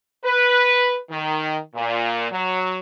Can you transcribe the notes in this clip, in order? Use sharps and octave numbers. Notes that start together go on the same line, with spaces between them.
B4
D#3
A#2
F#3